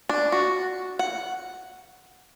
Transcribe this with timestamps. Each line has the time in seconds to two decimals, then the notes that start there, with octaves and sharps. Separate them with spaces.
0.09 D4
0.32 F#4
0.99 F#5